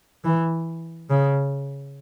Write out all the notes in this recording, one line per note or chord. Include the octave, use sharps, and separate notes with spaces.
E3
C#3